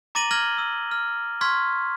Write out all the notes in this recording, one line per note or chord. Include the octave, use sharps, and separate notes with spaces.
A#5 D6 A6 A#6 D#7 F#7
F6 G#6 A#6 D#7 F#7 G7
E6
F6
C6 C#6 F6 G#6 B6